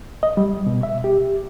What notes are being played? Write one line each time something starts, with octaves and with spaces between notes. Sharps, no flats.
D#5
G3
B2
E5
G4